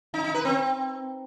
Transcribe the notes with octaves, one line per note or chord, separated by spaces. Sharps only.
D#4
D#4
B4
C4